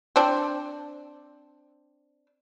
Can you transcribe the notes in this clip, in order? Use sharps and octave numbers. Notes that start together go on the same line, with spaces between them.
C4 D4